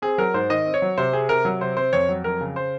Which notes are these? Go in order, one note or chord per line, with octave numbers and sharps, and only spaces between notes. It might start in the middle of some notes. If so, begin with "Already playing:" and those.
C4 G#4
F#3 A#4
G#2 C5
D#3 D#5
C4
C#5
F#3
C3 C5
C4 G#4
C3 A#4
F#3
C3 C5
C4 C5
F2 C#5
F#3
F2 A#4
C#3
C5